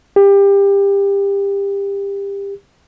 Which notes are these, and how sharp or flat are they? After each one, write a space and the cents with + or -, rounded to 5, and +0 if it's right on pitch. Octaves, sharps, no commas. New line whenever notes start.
G4 +25